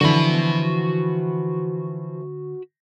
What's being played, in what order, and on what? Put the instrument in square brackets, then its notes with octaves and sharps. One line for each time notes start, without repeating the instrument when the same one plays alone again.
[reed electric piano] D3 [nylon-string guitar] E3 F3 E4 [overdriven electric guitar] F#4 B5